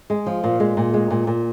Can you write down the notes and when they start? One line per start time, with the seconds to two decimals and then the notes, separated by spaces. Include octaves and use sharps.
0.10 G#3
0.26 F3
0.44 A#2
0.60 G#3
0.77 A#2
0.94 G#3
1.10 A#2
1.27 A#2